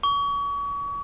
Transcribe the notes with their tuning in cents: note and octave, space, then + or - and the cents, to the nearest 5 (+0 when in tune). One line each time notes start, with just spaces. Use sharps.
C#6 +35